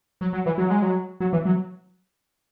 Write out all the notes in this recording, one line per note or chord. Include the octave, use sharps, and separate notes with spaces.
F#3
F#3
E3
F#3
G#3
F#3
F#3
E3
F#3